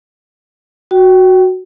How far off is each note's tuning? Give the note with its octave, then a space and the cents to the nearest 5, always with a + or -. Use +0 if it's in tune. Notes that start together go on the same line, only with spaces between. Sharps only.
F#4 +0 G5 -20